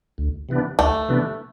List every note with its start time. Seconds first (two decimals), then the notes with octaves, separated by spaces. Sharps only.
0.18 D2
0.49 C3 E3 B3 D4
0.79 D2 A3
1.09 C3 E3 B3 D4